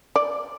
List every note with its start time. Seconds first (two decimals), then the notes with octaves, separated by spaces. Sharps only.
0.16 D5